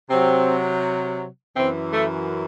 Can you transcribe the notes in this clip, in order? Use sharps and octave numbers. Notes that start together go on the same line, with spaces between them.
C3 F#3 C4
F#2 E3 C4
A3